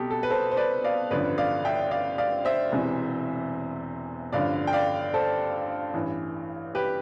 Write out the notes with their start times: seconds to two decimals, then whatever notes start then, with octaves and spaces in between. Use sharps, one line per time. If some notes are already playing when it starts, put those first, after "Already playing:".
Already playing: C2 B2 G4 A4
0.11 A4
0.23 B4
0.30 A4 C5
0.51 C5
0.57 B4 D5
0.84 D5 F5
1.11 A1 G2 D3 F3 B4 D5
1.38 D5 F5
1.65 E5 G5
1.91 D5 F5
2.18 D5 F5
2.45 C5 E5
2.72 E1 E2 C3 E3
4.33 A1 G2 D3 F3 D5 F5
4.67 G5
4.73 D5 F5
5.14 A4 C5
5.93 A1 G2 E3
6.75 G4 B4